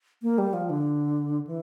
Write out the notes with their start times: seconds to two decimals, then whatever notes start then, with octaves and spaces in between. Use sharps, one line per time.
0.23 A#3
0.38 G3
0.53 F3
0.70 D3
1.47 E3